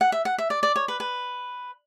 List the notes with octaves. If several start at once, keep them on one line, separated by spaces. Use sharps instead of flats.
F#5
E5
F#5
E5
D5
D5
C#5
B4
B4